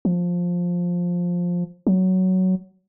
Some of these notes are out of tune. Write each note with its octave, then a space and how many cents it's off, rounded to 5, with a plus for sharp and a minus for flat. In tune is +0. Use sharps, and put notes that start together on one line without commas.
F3 +10
F#3 +10